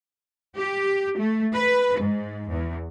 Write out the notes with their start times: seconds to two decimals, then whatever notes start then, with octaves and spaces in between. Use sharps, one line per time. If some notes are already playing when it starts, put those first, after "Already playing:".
0.56 G4
1.18 A3
1.54 B4
1.99 G#2
2.50 E2